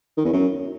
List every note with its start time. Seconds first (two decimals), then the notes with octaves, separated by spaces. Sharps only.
0.17 D#3
0.25 E2
0.33 F#2